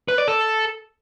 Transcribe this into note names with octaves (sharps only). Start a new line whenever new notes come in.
B4
D5
A4